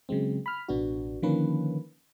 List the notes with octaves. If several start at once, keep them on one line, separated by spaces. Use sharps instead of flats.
C#3 F#3 G#3 C4
B5 F6
A1 B2 B3 D4 F#4
D3 D#3 F3 A#3 C#4 B4